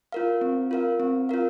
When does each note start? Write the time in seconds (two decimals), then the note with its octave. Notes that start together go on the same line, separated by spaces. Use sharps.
0.12 F4 A#4 F5
0.41 C4
0.71 F4 A#4 F5
1.00 C4
1.29 F4 A#4 F5